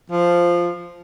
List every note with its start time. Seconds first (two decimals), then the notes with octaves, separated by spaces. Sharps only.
0.11 F3